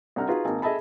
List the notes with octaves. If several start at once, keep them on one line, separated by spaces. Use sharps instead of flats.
C2 D4 F#5 A#5 F6
D#4 F4 F#4 G#4 B4
G#1 A#3
G#4 A4 D#5 E5 A5 B5